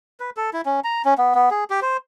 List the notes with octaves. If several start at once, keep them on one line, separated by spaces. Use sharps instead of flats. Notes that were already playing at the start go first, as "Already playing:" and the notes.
B4
A4
E4
C#4
A#5
C#4
B3
B3
G#4
G4
C5